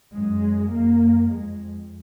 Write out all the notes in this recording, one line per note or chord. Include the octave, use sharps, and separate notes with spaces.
F#2 G#3
F#2 A#3
F2 G#3